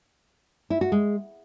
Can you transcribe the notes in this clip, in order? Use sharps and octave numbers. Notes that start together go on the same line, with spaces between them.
E4
F#4
G#3